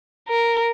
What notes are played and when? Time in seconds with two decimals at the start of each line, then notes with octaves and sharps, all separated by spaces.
0.28 A#4